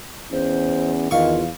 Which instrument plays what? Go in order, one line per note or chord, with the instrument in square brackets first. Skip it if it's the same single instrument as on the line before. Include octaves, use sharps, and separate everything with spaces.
[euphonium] E2 [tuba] C#4 [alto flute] C5
[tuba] E2 [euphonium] D#3 [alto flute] F4 [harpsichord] F5 C#6